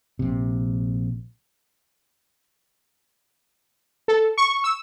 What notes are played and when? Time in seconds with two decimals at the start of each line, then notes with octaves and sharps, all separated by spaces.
0.19 A#1 C3
4.08 A4
4.38 C#6
4.64 E6